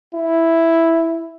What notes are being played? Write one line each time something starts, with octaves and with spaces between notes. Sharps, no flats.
E4